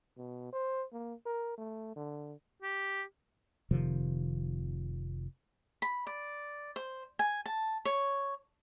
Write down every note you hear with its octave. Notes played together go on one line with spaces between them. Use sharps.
B2
C5
A#3
A#4
A3
D3
G4
F1 C3 D#3 F3
B5
D5
C5
G#5
A5
C#5